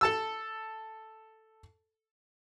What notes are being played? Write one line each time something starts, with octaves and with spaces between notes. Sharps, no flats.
A4 A5 E6